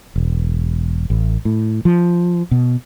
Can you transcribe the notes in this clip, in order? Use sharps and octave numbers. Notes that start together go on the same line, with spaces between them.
E1
A1
A2
F3
B2